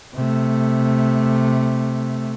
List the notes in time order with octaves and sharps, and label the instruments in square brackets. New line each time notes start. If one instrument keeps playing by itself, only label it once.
[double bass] C3 A3